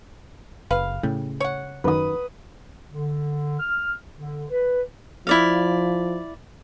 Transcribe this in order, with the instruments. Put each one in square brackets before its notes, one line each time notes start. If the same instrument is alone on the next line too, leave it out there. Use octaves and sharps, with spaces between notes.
[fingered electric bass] F#1 [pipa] B4 F5
[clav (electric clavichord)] A2 [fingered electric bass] C#3 [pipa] G3
[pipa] C#5 F#5
[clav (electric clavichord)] F#2 D#3 [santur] B4 D#6
[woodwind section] D3
F6
D3
B4
[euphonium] F3 [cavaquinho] E4 D5 F5